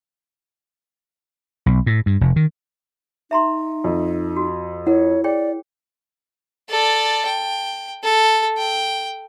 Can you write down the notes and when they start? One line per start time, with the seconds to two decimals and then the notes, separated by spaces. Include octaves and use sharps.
1.66 B1
1.86 A2
2.06 G2
2.21 F1
2.36 D#3
3.31 D#4 E5 A#5 C6
3.84 F2
4.36 F#4
4.87 E4 A#4 C#5 F#5
5.24 G#4 C#5 D5 G5
6.70 A4 D5
7.26 G5
8.03 A4
8.58 G5